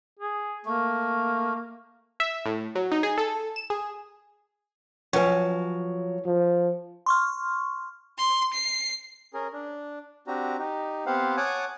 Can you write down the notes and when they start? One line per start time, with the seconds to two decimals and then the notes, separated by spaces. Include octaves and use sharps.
0.19 G#4
0.65 A3 A#3
2.20 E5
2.46 A2
2.75 F#3
2.91 D#4
3.03 G#4
3.18 A4
3.56 E7
3.70 G#4
5.13 F3 F#3 C#4 B4 C#5 G#5
6.26 F3
7.06 C6 C#6 F6
8.18 C6
8.53 C7
9.34 C#4 G#4 A#4
9.53 D4
10.27 C4 D4 F#4 G4 A#5
10.59 D#4 G4
11.06 B3 C4 G4 C5 F5 F#5
11.37 C#5 F#5 G#5 A5 D6 D#6